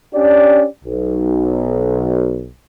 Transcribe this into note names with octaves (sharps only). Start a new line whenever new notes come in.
C#4 D4 G4 D5
B1